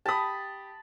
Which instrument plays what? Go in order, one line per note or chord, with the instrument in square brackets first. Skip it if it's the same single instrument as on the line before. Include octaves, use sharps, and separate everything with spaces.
[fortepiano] G4 D#6 [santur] A5 B5